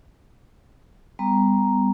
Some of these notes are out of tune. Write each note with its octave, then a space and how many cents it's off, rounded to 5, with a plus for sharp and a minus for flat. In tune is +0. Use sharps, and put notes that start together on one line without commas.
G3 +30 B3 +30 A#5 +0